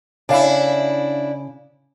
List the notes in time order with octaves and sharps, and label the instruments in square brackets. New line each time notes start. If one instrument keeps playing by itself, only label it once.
[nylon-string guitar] C#3 F5 [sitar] D4 E4